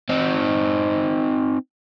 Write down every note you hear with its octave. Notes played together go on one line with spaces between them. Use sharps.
C4 D#4